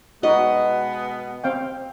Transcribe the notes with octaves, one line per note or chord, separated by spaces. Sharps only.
B2 G#3 B3 D#4 F#4 D#5
C4 F5 G5